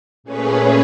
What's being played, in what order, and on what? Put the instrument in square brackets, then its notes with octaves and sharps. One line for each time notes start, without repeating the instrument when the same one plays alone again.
[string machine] A#2 A3 C#4 G#4 B4 C#5